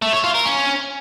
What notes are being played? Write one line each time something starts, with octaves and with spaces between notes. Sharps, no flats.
A3
C#5
F4
A#4
C#4